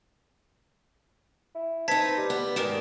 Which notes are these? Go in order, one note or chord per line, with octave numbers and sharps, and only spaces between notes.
E4
C4 D#4 B4 A5 G#6 B6
G3
B3
G#2 D#3 A#4 D5 E7